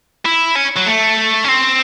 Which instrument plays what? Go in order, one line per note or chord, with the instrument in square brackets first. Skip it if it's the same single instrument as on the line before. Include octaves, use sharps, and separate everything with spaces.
[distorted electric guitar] E4
C#4
F#3
A3
C#4
C4